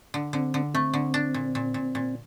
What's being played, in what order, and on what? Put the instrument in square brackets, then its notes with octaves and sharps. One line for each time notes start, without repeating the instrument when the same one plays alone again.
[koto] D3
[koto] D3 [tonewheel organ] C4
[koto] D3
[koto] A3 [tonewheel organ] C4
[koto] D3
D4
A#2
A#2
A#2
A#2